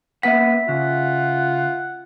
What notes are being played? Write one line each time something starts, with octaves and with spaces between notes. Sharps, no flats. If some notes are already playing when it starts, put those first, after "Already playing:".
A#3 B4 E5 F#5 B6
C#3 F4 F#5